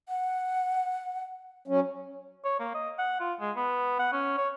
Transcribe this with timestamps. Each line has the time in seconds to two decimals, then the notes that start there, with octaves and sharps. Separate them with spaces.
0.09 F#5
1.68 F#3 C#4
2.45 C#5
2.60 A#3
2.74 D#5
2.99 F#5
3.20 F4
3.40 G#3
3.56 B3
3.99 F#5
4.13 C#4
4.38 C#5